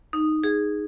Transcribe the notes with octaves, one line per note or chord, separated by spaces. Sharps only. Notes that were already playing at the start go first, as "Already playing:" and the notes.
D#4
G#4